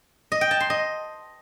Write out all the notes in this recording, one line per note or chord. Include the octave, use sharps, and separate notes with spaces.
D#5
G5
A5
C6
D#5